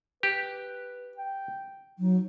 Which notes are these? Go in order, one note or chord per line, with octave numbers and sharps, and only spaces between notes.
G4 B4
G5
F#3 D#4